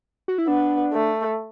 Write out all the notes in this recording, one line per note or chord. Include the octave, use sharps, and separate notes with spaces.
F#4
E4
B3 D4
A3